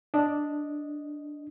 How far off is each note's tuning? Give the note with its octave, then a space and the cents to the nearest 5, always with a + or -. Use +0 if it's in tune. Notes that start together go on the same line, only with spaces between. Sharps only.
D4 +0 D#5 +0